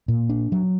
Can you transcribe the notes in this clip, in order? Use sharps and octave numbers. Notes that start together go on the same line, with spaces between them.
A#2
D4
F#3